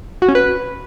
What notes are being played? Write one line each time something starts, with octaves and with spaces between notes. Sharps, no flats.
F#4
C#4
B4